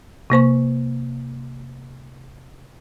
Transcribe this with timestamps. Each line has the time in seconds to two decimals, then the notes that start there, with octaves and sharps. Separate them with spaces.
0.30 C3 A#3 C5 C#6